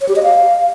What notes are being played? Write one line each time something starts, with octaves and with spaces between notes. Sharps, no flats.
C#5
G4
D#5
F5